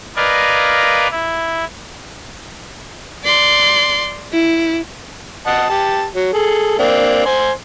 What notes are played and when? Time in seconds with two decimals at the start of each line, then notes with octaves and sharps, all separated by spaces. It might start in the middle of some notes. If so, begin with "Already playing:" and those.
0.16 A#4 B4 D5 D#5 F5 G#5
1.11 E4
3.24 D5 C6
4.33 E4
5.46 D#5 F#5 A5
5.70 G4 A5
6.15 F#3
6.33 G#4 A4
6.79 A#3 C4 D4
7.26 C5 G#5 C6